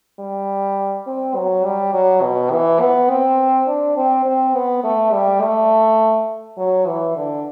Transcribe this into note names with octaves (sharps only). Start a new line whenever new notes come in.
G3
C4
F#3
G3
F#3
B2
E3
B3
C4
D4
C4
C4
B3
A3
G3
A3
F#3
E3
D3